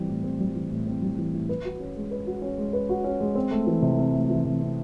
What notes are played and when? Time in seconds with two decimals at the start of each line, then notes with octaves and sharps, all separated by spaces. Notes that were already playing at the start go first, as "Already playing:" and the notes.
Already playing: E3 G3 C4
0.09 A2
0.24 C4
0.40 G3
0.55 E3
0.71 A2
0.87 C4
1.02 G3
1.18 E3
1.34 A2
1.49 B4
1.65 F#4
1.80 C#4
1.96 G#3
2.11 B4
2.27 F#4
2.42 C#4
2.58 G#3
2.73 B4
2.89 F#4
3.04 C#4
3.20 G#3
3.35 C4
3.51 A3
3.67 E3
3.82 C3
3.98 C4
4.13 A3
4.30 E3
4.45 C3
4.61 C4